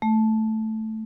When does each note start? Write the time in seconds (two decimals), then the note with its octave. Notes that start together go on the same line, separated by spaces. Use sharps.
0.02 A3